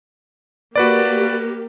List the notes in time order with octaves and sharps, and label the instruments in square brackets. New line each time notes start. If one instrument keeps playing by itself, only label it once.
[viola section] A#3 G4 [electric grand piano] F#4 B4 D5